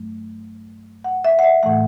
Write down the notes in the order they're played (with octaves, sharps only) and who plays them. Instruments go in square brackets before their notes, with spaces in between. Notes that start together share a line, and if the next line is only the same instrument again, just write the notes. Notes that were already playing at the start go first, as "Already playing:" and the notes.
Already playing: [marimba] G2 F#3 A3
F#5
E5
F#5
E5
A2 E3 A3 F#5